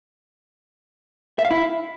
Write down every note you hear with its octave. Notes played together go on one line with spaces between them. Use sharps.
E5
F5
E4